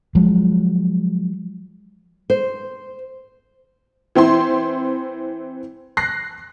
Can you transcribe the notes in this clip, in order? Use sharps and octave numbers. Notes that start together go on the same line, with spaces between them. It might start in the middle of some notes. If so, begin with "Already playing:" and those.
F3 F#3 G#3
C5
E3 C4 E4 C6
F#6 A#6 C7